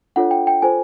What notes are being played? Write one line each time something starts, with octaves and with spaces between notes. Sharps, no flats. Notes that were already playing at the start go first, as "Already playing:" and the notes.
D4 F4 A4 C#5 F#5
G5
G5
F4 A4 C5 G#5